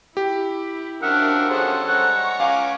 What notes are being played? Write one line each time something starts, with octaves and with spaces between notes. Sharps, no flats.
E4 G4
F#2 F3 D4 A#4 E5 F#5
C#4 G#4 A4 C5
G3 G#3 C#5 F#5 A#5
C#4 F5 G#5 D6